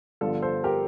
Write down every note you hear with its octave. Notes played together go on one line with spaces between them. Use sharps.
G1 G2 D3 F3 F4 A4
A4 C5
G4 A#4